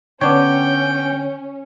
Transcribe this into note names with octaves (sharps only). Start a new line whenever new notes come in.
D3 B3 C#4 D4 C#5 G5